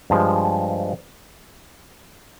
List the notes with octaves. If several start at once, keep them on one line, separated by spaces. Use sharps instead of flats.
G2 F3 G#3